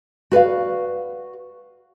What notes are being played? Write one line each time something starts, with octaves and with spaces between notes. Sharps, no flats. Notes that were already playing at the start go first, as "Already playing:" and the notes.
F#4 B4 D5 F5